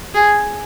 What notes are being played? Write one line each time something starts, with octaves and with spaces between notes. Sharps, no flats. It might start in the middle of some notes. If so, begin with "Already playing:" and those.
G#4